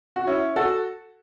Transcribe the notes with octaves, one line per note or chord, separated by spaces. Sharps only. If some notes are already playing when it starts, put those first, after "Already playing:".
F#4
C#4 E4
F#4 A4